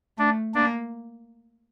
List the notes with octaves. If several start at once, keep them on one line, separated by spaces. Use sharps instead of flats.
A3 D4
A#3 D4